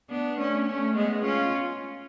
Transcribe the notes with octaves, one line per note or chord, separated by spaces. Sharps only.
B3 D4
A3 C#4
A3 C#4
G#3 B3
C#4 F4